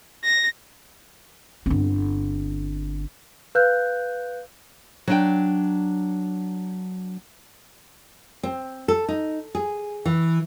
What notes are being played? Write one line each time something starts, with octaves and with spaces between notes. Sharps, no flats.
A#6
G1 C4
B4 F5 F#6 G6
F#3 D4 G5
C4
A4
D#4
G#4
E3